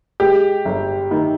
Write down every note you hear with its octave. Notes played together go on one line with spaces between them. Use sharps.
G#3 G4
G1
D#3